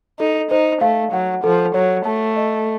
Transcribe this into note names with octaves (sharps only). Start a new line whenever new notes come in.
D#4 A4
D#4 C5
A3 F5
F#3 F#5
F3 A4
F#3 C#5
A3 A5
D#5